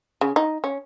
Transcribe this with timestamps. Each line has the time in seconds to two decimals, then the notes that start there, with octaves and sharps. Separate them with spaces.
0.21 C#3
0.36 D#4
0.64 C#4